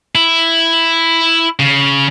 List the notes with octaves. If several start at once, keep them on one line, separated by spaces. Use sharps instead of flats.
E4
C#3